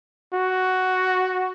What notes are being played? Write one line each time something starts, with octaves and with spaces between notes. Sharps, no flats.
F#4